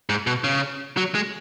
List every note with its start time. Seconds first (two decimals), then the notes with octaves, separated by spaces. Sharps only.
0.09 G#2
0.27 B2
0.44 C#3
0.97 F#3
1.15 G#3